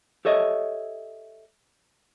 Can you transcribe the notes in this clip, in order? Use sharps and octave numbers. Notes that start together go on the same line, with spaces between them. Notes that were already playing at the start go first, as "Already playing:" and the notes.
G4 A4 C#5 D#5 E5